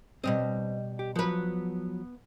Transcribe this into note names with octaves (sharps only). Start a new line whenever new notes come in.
B2 G3 C4 D#5
G4
F3 F#3 B3 B4